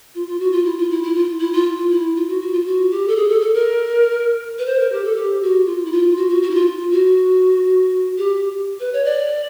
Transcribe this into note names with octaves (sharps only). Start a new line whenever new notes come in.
F4
F4
F#4
F4
E4
F4
E4
E4
F4
E4
F4
E4
F4
F#4
F#4
F4
F#4
G4
A4
G#4
A4
A4
A#4
B4
C5
A#4
G4
A4
G4
F#4
F4
E4
F4
F#4
F#4
F#4
E4
F4
F#4
G4
B4
C#5
D5